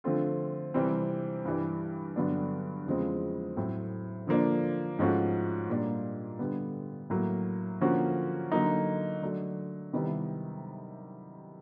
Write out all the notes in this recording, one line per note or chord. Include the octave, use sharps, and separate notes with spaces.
D3 F3 A3 C4 F4
C3 E3 G3 C4
G2 E3 G3
G2 D3 F#3 B3 D4
E2 C#3 F3 G#3 C4
A2 F#3 A3 C4
D3 F3 A#3 D4
G#2 F3 A3 C#4 F#4
A#2 G3 A#3 D4 F4
D3 G3 B3
A2 F#3 A#3
D3 F3 A#3 C#4 F#4
D3 F#3 A#3 D#4
D3 F#3 A3 D4
C3 D#3 G3 B3 E4